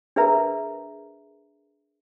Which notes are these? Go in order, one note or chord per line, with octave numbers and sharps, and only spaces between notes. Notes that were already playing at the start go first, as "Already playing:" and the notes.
D4 G#4 A#4 B4 E5 A#5